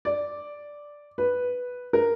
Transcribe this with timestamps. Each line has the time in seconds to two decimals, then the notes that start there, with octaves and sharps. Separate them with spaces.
0.05 D5
1.18 B4
1.93 A#4